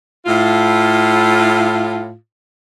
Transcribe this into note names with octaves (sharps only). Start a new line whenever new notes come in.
A2 F4